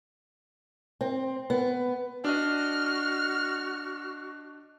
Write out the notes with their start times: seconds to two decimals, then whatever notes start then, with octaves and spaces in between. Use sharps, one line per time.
1.01 C4
1.50 B3
2.25 D4 F#4 D#5 F6